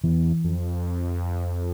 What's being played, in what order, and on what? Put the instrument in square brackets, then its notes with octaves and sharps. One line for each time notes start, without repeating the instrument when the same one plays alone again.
[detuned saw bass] E2 [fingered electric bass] E3
[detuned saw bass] F2